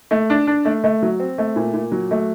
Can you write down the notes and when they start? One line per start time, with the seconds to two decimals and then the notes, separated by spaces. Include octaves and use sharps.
0.11 A3
0.30 D4
0.47 D4
0.65 A3
0.84 A3
1.02 F#3
1.20 C4
1.38 A3
1.56 A#2
1.74 A#2
1.92 F#3
2.11 A3